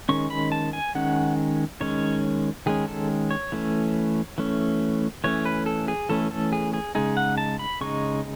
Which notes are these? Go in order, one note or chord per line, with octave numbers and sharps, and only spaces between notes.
D#3 G#3 C#4 C#6
B5
A5
G#5
D#3 G#3 C#4 F#5
D#3 G#3 C#4 C#5
D#3 G#3 C#4 G#4
A4
C#5
E3 A3 C#4
E3 A3 C#4
E3 A3 C#4 C#5
B4
A4
G#4
E3 A3 C#4 A4
A4
G#4
G#4
C#3 G#3 D#4 G#4
F#5
A5
B5
C#3 G#3 D#4 C#6